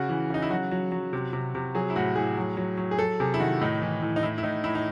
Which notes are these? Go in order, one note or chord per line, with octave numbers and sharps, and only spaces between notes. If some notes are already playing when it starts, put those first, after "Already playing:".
Already playing: C#3 F#4
E3
C#3 D#4
E4
F#3 F#4
F#3
F#3
C3
C3
C3
F#3 G#4
E4
A2 F#4
A2 G#4
F#3
F#3
F#3
G#4
F#3 A4
C3 G#4
E4
D#3 F#4
A2 D#4
E3
A2
D#4
A2 E4
E4
A2 D#4
A2 E4
D#4